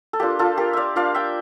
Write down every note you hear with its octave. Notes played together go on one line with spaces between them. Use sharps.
A4
A#3 D4 F4 G4
F4 A4
G4 A#4
D5 E5 F5
A#3 D4 F4 D5 F5
E5 G5